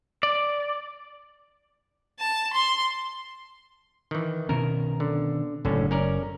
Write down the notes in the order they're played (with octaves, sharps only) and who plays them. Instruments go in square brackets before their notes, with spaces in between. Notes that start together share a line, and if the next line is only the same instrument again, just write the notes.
[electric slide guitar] D5
[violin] A5
C6
[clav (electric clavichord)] D#3 E3
[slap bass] B2 D#3 C#4 [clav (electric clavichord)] A#4
[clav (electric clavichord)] D3
[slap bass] F#1 [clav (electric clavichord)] A2 D3 C#4
[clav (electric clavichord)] C#4 A#4 D5